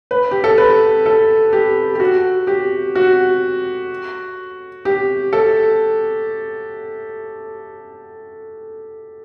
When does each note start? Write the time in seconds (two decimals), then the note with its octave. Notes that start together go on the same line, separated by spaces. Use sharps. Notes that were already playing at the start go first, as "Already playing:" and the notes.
0.11 B4
0.31 G4
0.44 A4
0.58 B4
1.06 A4
1.53 G4
1.95 G4
2.00 F#4
2.47 G4
2.95 F#4
4.85 G4
5.33 A4